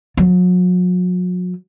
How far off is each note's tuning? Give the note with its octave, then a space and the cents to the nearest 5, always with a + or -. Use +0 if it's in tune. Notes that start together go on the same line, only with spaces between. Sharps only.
F#3 -40